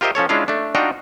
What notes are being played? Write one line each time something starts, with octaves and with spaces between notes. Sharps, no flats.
F4 G4 A#4 C5 D#5 E5
F3 C#4 A4 C#5
G#3 C#4 D4 E4 F4 F5
A3 D4
D4 D#4 F4 F#4 G5 A#5